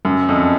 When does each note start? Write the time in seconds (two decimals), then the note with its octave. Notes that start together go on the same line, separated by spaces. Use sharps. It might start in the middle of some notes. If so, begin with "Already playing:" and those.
0.05 F#2
0.29 F2